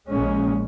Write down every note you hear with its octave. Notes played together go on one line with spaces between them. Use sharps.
A#1 A#2 G#3 C#4